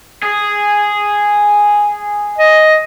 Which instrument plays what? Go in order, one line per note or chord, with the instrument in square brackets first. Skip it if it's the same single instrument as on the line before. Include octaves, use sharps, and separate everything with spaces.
[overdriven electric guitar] G#4
[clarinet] D#5